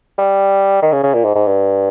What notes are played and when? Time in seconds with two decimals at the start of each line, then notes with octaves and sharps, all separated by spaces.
0.18 G3
0.82 D#3
0.93 C#3
1.03 C#3
1.14 A#2
1.24 G#2
1.35 G#2
1.46 G2